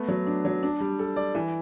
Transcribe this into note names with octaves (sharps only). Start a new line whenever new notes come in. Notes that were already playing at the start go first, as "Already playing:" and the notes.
Already playing: A3 B3
F#3
D4
F#3
D4
G3
A4
D5
E3